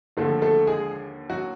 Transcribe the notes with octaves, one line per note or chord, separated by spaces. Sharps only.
D#2 D3 F3 A3 A4
A3 A4
G#3 G#4
F#3 F#4